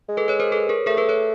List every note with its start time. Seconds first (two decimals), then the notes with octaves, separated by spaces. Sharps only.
0.08 G#3
0.17 A4 B4
0.28 B4 C#5
0.40 A#4 C5
0.52 A4 B4
0.69 G#4 A#4
0.86 A3 G#4 A#4
0.97 A4 B4
1.09 B4 C#5